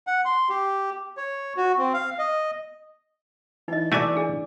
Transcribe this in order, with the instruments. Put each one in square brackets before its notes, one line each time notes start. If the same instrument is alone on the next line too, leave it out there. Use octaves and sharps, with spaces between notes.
[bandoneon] F#5
C6
G4
C#5
F#4
C4
F5
D#5
[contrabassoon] E3 [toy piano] D#4 D#5
[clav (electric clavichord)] A3 F#4 G#5 [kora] D5 E5
[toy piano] D4 G#4